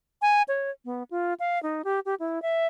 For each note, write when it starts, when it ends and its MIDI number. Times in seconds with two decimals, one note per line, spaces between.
0.22 0.42 80
0.48 0.71 73
0.85 1.03 59
1.11 1.34 65
1.40 1.61 77
1.63 1.82 63
1.84 2.00 67
2.05 2.15 67
2.20 2.41 64
2.42 2.67 76